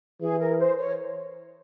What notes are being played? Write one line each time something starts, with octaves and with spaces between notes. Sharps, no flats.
E3 G#4
A#4
C5
C#5